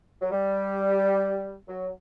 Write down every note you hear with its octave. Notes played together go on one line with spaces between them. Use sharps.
F#3
G3
F#3